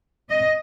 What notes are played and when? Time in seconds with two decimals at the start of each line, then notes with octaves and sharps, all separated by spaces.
0.30 D#5